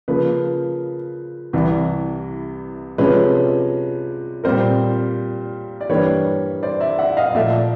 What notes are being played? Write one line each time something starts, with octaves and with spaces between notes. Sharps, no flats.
C#3 F3 A#3 B4
C2 C3 E3
C3 F3 G#3 C#4 B4
A#2 G3 C4 A#4 C5
D5
G2 E3 G3 A#3 B4 C#5
C5 D5
D5 E5
E5 F#5
D#5 F5
A#2 F3 A3 D5 E5